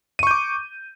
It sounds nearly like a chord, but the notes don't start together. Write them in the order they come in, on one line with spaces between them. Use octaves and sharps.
D#7 C#6 G6 D6